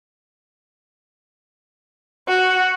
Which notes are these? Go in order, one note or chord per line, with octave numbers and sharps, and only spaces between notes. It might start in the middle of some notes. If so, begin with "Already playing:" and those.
F#4